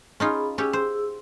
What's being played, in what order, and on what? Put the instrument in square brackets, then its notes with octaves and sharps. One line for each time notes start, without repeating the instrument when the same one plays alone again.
[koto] C#4 D#4 F4 [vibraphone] G#4 B5
[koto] C#4 G4 [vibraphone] G#4 E6
[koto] C5